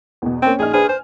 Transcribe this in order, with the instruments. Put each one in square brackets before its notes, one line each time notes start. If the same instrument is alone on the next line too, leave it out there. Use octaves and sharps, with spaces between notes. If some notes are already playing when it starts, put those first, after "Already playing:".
[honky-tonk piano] E2 B2
[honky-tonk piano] A#3 C#4 G5 [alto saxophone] C4
[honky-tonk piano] A#1 D#4 F6 [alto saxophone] G#4
[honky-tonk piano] D4 B4 C5 [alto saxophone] G#4
[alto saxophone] C5 [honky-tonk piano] G#5